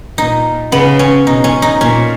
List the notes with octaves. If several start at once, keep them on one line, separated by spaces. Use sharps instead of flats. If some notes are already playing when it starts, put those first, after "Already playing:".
A#2 D#4
C#3 B3
C#4
B2 D#4
C#4
D#4
A#2 C#4